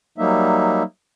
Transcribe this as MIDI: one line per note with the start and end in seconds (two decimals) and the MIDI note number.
0.18 0.83 54
0.18 0.83 55
0.18 0.83 58
0.18 0.83 63
0.18 0.83 76